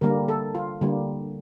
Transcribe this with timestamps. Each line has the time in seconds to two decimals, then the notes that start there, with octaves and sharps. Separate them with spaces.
0.01 D3 G3 A#3 A#4
0.28 A4
0.55 F4
0.81 D3 G3 A#3